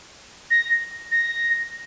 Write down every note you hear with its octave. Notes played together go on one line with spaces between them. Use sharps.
A#6
A#6